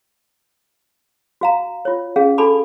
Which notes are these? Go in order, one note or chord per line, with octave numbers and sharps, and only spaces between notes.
F#4 F5 A#5
F4 C#5
C#4 G#4 F5
D4 F#4 A4 A5 B5 D6